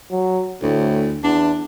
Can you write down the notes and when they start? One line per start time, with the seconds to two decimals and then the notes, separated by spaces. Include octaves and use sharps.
0.11 F#3
0.62 D2 A2
1.24 E2 D4